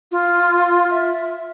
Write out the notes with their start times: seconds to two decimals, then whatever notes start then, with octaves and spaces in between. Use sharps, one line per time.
0.12 F4
0.90 E5